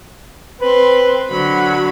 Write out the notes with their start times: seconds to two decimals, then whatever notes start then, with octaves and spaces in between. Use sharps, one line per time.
0.60 C4 B4
1.29 D3 F#3 F#4 B5